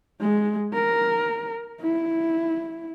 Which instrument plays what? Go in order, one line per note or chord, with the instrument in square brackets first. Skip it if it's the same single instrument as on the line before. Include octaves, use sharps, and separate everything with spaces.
[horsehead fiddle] G#3
A#4
E4